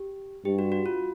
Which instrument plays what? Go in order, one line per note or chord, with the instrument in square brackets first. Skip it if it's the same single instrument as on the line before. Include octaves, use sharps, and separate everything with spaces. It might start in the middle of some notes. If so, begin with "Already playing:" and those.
Already playing: [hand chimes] G4
[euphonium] G2 [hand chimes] G4
[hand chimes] F#4
F#4
F4